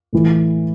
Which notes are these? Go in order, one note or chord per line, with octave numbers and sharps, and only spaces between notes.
A2 E3